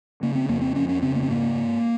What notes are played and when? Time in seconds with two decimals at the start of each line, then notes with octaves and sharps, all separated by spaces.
0.23 C#3 A#3
0.35 C4
0.49 F2 A#3
0.61 C4
0.76 F2 C#4
0.89 C#4
1.02 C#3 C4
1.15 A#3
1.23 C4
1.28 G#2 A#3
1.55 G#2